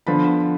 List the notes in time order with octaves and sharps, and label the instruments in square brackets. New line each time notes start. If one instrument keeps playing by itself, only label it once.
[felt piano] D3 F3 B3 B5